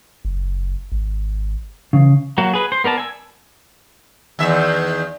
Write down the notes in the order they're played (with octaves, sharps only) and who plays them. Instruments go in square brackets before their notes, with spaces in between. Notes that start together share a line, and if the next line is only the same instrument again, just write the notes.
[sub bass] F#1
G#1
[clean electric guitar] C#3 [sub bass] E3
[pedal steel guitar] F#3 A#3 F#4
G#4 B4
C5
B3 A#4 D5 A5
G#5 E6
[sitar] E2 D#3 E5